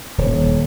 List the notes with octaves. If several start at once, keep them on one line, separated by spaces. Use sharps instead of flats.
D#1